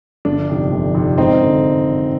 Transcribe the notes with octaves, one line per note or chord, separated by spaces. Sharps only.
G1 D4
F2 C3 D#3
G1
F2 C3 D#3
G#1 C4 D#4
D3